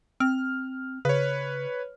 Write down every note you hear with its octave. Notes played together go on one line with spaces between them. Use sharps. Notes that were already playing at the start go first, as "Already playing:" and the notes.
C4 F6
C#3 B4 C#5